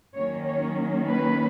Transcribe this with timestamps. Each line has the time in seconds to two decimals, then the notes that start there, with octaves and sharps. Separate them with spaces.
0.15 D#3 F#3 A#3 C#4 C#5
0.46 C#5
1.06 B4